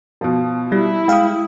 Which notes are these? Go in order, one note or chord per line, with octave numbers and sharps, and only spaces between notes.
B2 F3
G3 E4
G#3 F5 G5 D#6